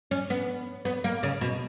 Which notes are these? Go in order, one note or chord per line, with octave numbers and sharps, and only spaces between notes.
C#4
B3
B3
A#3
C#3
B2